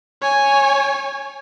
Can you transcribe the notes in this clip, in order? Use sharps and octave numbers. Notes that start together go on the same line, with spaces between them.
C#5 G#5